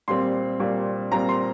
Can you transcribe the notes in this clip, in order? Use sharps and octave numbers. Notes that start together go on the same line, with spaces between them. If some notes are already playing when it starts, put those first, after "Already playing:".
A#2 G3 C4 C6
A#2 G3 C4
A#2 G3 C4 A#5
C6